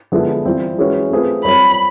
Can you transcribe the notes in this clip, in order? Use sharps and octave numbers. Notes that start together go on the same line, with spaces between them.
D3 F3 G#3 B3 E4
E3 G3 C4 F4
E3 G#3 C#4 F#4 B4
A3 C4 F4 G#4 B4
G3 C4 F4 A#4 C#5 B5